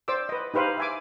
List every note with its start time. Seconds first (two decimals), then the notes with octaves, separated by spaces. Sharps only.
0.08 C5 D5 D6 E6
0.29 B4 D#5
0.54 D#4 G4 B4 C5 F5
0.78 E5 G#5 D6